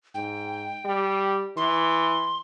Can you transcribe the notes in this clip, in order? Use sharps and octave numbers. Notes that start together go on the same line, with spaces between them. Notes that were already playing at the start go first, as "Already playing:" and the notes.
G#2 G5
G3
E3 C6